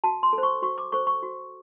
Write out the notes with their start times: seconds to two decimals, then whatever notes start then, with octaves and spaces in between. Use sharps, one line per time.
0.04 F#4 A5
0.23 C6
0.33 A4
0.38 C5
0.43 C#6
0.62 F#4 C#6
0.78 D6
0.92 A4 C5 C#6
1.07 C#6
1.22 F#4